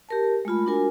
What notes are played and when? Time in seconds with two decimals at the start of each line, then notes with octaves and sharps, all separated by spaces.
0.09 G4 A#4 A5
0.45 G#3 A3 F4 B5
0.66 D4 F#4 A#4 G#5